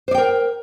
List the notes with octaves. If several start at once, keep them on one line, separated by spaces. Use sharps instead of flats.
A#4 C5 D5 G5